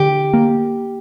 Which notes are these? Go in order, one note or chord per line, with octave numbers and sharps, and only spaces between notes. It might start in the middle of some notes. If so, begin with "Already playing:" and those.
Already playing: D3 G4
A#3